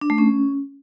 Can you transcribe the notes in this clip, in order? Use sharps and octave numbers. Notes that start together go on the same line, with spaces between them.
D4
A3
C#4